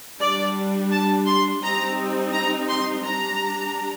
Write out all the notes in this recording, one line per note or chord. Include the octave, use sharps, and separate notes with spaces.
G3 D4 D5
A5
C6
G3 C4 D#4 A#5
A#5
C6
G3 D4 A#5